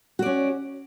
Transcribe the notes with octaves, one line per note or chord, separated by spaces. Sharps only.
C#4 F#4 D5